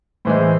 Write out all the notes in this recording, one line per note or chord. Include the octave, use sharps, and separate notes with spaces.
A2 E3 G#3 C5